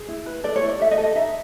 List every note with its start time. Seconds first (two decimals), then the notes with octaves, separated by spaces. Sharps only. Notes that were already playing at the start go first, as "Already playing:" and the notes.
Already playing: G#4
0.08 E4
0.26 B4
0.44 A4 D5
0.56 C#5
0.62 E4
0.68 D5
0.80 A4 E5
0.91 D#5
0.98 A4
1.04 D#5
1.15 D#4 E5